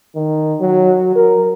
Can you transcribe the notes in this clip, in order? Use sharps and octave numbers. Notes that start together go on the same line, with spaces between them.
D#3
F#3
A#4